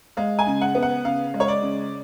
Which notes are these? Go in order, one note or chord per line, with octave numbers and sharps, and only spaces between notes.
G#3 F5
G#5
C#3
F#5
B3
F#5
C#3 F5
G#3
C#5
D5
C#3